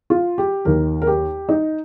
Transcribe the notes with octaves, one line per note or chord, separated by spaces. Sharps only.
F4
G4
D#2 D#3 A#4
A#4
G4
D#4